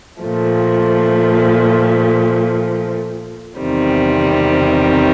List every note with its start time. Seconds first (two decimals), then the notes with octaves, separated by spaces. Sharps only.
0.20 A#2 F3 A3
3.59 E2 C3 D#3 G3 C4